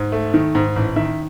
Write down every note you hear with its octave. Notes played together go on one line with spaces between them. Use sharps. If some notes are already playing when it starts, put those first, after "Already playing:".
Already playing: G#2
A3
D#3
G#2
A1
D#3 E5